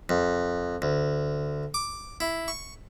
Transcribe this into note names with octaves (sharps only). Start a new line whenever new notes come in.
F2
D2
D6
E4
C#6